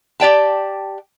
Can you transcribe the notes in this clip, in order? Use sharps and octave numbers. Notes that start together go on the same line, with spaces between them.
G4 D5 G5 A5